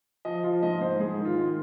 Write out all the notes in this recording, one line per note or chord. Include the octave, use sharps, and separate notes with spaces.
F3 D#5
F3 F4
G#2 D#5
G#2 C5
G#2 G#4
D#3
F4
D#3